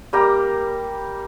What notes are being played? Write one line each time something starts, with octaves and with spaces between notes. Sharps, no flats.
G3 A#3 G4 A#5